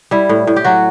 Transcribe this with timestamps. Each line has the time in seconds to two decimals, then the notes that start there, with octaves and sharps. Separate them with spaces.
0.11 G3 E4
0.29 A2
0.47 A2
0.56 G4
0.64 F#3 F#4